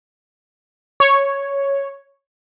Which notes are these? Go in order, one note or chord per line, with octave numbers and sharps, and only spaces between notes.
C#5